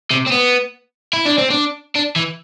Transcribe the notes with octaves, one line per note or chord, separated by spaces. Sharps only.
C3
C4
B3
E4
D4
C4
D4
D4
E3